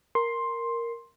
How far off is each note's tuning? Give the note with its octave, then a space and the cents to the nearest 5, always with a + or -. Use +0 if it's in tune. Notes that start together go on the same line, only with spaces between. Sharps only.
A#4 +0 C6 +10